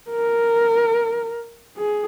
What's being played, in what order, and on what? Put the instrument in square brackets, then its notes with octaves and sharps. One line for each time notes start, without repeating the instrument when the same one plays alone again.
[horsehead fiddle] A#4
G#4